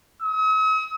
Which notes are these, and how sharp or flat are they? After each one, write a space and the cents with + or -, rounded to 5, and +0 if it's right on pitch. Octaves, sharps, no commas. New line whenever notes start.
D#6 +45